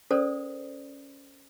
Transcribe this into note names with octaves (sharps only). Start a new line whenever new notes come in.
C#4 A4 A#4 C5 D5 D#6